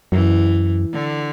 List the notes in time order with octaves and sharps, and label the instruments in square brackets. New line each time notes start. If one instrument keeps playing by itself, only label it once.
[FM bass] F#2 [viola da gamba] E3
[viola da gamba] D3